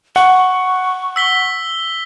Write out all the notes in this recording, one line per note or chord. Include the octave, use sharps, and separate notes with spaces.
F#5 C#6
E6 B6 G7